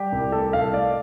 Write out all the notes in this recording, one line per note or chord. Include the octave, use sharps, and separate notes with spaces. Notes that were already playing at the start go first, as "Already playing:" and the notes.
Already playing: G3 G4
C2
A3 A4
C2 F5
A3 D5